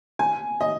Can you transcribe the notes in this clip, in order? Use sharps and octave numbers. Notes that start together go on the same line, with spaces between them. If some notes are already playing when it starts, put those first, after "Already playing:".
G#5
D#5